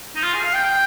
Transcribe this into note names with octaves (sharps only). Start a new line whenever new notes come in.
D#4
F4
G#4
F5
G5
G5